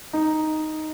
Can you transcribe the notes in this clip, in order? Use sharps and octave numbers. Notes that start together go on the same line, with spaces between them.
D#4